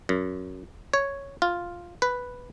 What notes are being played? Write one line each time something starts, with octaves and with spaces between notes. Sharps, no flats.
F#2
C#5
F4
B4